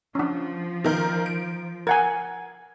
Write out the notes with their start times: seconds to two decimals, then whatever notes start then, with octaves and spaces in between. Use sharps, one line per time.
0.15 F3 C#4 D4
0.84 D#3 A#4 G6
1.26 D7
1.87 A#4 F#5 G#5 G#6